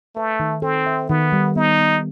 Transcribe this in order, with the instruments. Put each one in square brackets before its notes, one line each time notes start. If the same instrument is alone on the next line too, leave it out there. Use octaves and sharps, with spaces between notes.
[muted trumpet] A3 [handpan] B4
[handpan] D#3
[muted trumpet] C4 [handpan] A4
[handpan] E5
[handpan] D#3 [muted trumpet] B3
[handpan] G3
[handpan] B3 [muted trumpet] D#4
[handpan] B3